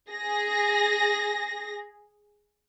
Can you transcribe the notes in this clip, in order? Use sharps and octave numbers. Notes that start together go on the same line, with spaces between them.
G#4 A#6